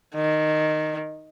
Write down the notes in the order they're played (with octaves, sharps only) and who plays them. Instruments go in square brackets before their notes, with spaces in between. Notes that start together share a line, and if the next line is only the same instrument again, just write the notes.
[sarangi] D#3